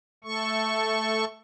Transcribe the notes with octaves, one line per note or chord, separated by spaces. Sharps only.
A3 A4 C#6